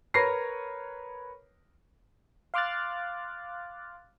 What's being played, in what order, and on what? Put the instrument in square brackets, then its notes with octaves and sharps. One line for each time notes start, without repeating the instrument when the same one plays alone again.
[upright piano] A#4 B4 C#5 A#6 C7
[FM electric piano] F5 C6 D6 F6 F#6 A6